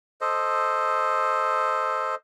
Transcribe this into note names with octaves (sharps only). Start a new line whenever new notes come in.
A4 C5 D#5